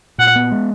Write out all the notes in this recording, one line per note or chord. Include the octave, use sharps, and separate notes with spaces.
A#2 F#5
B3
G#3